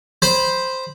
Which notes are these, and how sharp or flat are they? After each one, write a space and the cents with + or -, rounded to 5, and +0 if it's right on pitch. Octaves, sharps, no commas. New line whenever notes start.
C5 +0 B5 -10